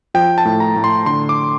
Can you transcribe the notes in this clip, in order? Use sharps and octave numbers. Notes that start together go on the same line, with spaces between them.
F3 G5
A5
A2
A#5
A2
C6
D3 C6
D6